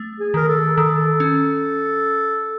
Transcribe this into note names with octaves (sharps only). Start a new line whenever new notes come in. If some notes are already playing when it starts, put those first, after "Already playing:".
Already playing: A3
G#4
D#3 A#4
A4
D#3 A4
C#4